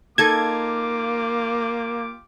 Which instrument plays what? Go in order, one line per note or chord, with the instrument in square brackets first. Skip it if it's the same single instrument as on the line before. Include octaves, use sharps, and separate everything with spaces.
[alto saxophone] A#3 [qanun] D#4 A4 A5 [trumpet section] F4 G4 D6 [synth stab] G#6